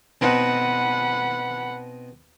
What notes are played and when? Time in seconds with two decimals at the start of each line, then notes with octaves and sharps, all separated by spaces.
0.21 B2 C4 D#4 F#5 B5